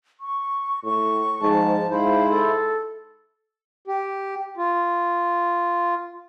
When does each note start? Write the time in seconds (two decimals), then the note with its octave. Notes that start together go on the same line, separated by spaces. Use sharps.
0.20 C#6
0.84 A2 C#6
1.42 G#2 F3 A5
1.90 G#2 E4 C5 F5
2.30 A4
3.88 G4
4.57 F4